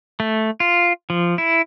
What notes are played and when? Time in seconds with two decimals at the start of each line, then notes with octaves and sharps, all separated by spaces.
0.20 A3
0.60 F4
1.10 F3
1.38 E4